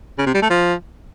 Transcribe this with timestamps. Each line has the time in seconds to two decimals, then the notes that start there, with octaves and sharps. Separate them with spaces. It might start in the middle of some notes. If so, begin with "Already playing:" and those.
0.19 C#3
0.26 C3
0.34 G3
0.42 A3
0.50 F3